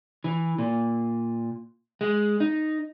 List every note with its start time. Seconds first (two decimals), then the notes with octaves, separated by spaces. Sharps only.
0.24 E3
0.58 A#2
2.01 G#3
2.40 D#4